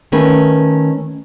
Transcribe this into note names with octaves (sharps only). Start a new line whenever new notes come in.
D#3 A3 C#4 A#4 B4